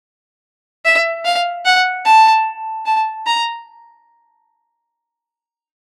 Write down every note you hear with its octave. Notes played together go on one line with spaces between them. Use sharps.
E5
F5
F#5
A5
A5
A#5